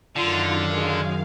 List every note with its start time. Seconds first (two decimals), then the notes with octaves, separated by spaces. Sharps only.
0.16 F#2 D3 D#3 F4 F5
0.71 G#3